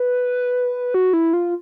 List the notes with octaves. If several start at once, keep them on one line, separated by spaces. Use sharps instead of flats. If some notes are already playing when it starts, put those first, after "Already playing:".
Already playing: B4
F#4
E4
F4